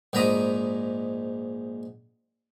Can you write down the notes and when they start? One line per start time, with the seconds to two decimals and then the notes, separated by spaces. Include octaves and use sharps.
0.13 A#1 G#2 A#4 A#5 B5 D#6